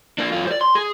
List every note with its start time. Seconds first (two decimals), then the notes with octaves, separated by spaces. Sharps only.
0.18 A#3 D4
0.32 F#2 F4
0.47 C5 D5
0.61 C6
0.75 G#4